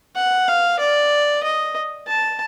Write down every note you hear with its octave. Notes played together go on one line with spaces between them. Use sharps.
F#5
F5
D5
D#5
A5